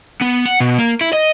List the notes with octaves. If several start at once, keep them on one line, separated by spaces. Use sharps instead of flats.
B3
F#5
B2
A#3
E4
D#5